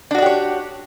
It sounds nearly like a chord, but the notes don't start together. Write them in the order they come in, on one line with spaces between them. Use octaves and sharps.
D4 F#4 D5 G4 C#5